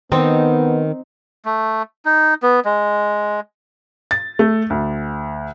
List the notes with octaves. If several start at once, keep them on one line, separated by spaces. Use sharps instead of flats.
D#3 B3 C4 D#4
A3
D#4
B3
G#3
A6
A3
D2